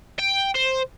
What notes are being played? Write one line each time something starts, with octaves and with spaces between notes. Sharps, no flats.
G5
C5